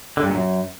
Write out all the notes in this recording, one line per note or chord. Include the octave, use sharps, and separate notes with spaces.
D3
G2
A#2
F#2